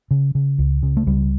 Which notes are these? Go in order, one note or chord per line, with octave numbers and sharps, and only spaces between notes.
C#3
C#3
C#2
C#3
A3
C#2 G3